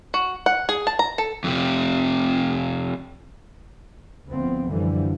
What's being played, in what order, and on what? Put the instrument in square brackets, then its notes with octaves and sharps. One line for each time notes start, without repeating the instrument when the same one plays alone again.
[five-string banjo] F#4
F#5
G#4
A5
A#5
A4
[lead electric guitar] F2 C3
[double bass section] D2 F3 B3 C4
F#2 D3 E3 F3 G3